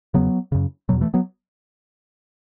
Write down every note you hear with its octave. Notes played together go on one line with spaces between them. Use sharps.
E2 C#3 F#3 B3
F#2 C#3
E2 B2 F#3
E3 A3
F#3 B3